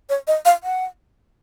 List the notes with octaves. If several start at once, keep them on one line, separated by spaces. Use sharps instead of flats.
C#5
D#5
F5
F#5